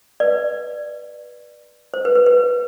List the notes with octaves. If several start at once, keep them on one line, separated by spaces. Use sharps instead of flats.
B4 D5
C5
B4
B4
B4